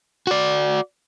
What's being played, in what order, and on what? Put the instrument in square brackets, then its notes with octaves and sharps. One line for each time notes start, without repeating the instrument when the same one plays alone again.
[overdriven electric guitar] F#4 D5